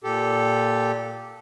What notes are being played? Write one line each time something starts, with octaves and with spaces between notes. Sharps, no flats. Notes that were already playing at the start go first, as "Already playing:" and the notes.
A#2 G4 A4